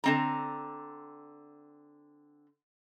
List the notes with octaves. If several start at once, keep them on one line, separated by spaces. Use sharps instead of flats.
D3 C4 A#5